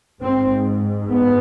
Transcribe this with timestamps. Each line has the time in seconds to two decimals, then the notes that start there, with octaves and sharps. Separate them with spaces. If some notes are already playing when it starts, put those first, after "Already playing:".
0.22 G#2 C4
1.10 B3